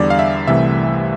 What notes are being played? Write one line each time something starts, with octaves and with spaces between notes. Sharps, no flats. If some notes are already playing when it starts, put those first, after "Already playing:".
Already playing: E2 D3 G3 D5
F5
E5
C2 C3 E3 A3 E5